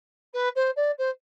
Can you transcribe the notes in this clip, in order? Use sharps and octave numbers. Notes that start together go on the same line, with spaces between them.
B4
C5
D5
C5